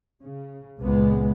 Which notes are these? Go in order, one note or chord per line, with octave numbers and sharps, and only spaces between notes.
C#3
C#2 A#2 G#3 B3